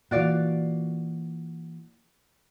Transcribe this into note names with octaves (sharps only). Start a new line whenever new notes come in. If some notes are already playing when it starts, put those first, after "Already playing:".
A#2 E3 F#4 D5 F5